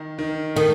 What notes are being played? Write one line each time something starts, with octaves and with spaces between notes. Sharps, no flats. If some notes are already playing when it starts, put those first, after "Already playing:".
Already playing: D#3
D#3
D#3 A3